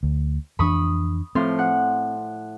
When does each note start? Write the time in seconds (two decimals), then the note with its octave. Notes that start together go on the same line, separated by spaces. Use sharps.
0.03 D2
0.59 F2 E3 D4 B5 C#6 D#6
1.35 A2 F3 C4 C6
1.59 F#5